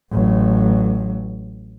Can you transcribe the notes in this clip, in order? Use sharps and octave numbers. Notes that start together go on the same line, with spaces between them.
A1 F#3